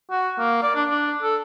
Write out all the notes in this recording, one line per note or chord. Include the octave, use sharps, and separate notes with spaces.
F#4
A#3
D5
D4
D4
A4